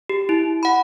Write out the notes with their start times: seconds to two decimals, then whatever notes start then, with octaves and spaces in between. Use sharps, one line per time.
0.09 G4
0.29 E4
0.63 F#5 B5